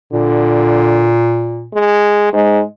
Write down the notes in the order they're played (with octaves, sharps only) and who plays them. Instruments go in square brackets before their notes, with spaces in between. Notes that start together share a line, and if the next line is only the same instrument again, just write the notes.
[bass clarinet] A#2 [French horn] D3
[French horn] G#3
[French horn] G#2 [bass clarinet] G#3